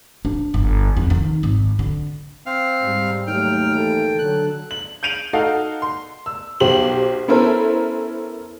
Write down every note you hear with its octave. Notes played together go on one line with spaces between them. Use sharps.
D4
G1
F2
D#3
G#1
D3
C4 F5
G#2 G3
D#2 F#3 A3 G5 F6
E3 A4
D3 F#3 F#6
F#7
G6 D7 D#7 F7 F#7
D#4 F#4 A4 F5
C6
E6
B1 F#4 G4 C5 F#7
B3 C#4 E4 A4 A#4 C5